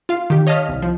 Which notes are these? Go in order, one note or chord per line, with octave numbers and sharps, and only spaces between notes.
F4 F5
D#3 G4
C#5 D#5 F5 A5 F6 B6
C2
F3